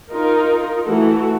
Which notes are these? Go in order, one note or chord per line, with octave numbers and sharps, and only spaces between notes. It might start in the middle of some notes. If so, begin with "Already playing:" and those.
D#4 F4 A#4
E3 A3 F#4 A4